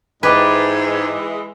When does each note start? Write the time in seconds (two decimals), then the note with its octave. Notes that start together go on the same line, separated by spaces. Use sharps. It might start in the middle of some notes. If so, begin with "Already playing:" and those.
0.23 G#2 E3 G#3 G4 B4 D5 G#5